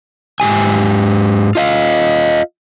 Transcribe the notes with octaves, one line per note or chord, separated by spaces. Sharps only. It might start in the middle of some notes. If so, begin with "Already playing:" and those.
G#2 B2 G4 G#5
F4 D#5 F5